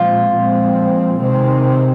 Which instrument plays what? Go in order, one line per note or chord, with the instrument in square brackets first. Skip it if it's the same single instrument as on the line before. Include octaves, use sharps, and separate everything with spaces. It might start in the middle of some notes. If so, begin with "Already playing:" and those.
Already playing: [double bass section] A#2 F3 G#3 C4 [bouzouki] F4
[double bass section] A#2 F3 G#3 C4
C3 D#3 G#3 C4